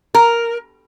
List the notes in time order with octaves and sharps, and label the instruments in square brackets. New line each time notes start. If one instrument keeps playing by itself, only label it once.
[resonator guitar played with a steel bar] A#4